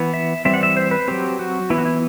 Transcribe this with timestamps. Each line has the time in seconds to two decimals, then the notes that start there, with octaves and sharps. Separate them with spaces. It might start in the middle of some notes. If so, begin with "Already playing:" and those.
Already playing: E3 B3
0.14 E5
0.45 E3 G3 C4 E5
0.54 F#5
0.63 E5
0.77 C5
0.91 B4
1.08 F#3 C4 G4
1.39 F#4
1.70 E3 B3 E4
1.78 F#4
1.85 E4